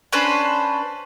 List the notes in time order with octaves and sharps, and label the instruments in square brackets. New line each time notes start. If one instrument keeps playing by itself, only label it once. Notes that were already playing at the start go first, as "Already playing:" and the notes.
[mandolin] C#4 D4 B4 C5